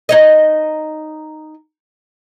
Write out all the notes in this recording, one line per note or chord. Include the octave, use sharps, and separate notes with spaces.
D#4 C#5 D#5